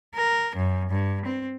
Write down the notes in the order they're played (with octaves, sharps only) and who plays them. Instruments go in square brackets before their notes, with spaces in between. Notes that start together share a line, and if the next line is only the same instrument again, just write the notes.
[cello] A#4
F#2
G2
C4